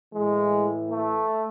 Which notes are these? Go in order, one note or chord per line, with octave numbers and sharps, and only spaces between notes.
A2 E3 G#3
A3